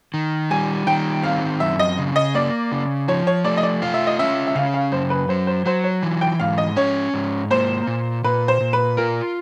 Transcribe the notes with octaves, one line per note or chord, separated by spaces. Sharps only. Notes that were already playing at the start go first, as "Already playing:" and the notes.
D#3
G3 G#5
D#3 G5
C4 F5
F#2 E5
D#5
C#3
D#5
A#3 D5
C#3
F3 C#5
C#5
A3 D5
D#5
D5
F4 F5
E5
D#5
C#4 E5
E5
C#3 F5
F5
F#2 C5
B4
F#3 C5
C5
F#3 C5
C#5
E3
G5
G#2 F5
D#5
C#4 C#5
G#2
A#3 C5
A#2
A#2 B4
C5
A#2
B4
F4 A#4